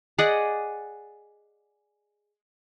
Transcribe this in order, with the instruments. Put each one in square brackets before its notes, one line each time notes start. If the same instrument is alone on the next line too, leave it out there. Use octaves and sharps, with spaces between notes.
[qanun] G#4 D5 D#5 F#5